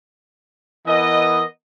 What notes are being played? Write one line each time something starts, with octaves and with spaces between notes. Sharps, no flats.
E3 B3 A#4 D#5